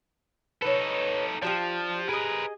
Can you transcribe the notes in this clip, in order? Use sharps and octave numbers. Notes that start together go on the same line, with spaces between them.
D#4 A4 B4 C#5
F3 D4 F4 G4
G#4 A#4 B4 D#5